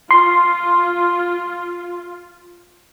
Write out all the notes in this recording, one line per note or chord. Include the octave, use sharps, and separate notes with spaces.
F4 C6